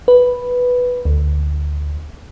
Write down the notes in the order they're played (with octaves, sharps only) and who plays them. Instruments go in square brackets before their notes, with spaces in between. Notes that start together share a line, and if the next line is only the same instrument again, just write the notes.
[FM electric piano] B4
D2